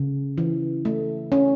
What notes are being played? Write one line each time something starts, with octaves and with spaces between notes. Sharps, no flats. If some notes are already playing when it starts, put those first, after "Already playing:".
Already playing: C#3
E3
A3
C#4